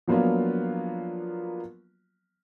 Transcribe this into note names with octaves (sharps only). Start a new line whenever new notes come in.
F3 F#3 A#3 B3 D4 F4